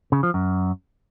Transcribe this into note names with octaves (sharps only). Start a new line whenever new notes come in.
C#3
F3
F#2